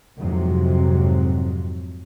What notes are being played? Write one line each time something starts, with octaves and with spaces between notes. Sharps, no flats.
F2 G#2 C3 F#3